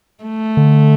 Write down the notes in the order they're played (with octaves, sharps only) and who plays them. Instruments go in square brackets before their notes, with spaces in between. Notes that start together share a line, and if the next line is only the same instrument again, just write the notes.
[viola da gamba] A3
[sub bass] D3